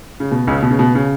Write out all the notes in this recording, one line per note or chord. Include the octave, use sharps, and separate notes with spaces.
C#3
B2
C#2 C#3
B2
C#3
B2
C#3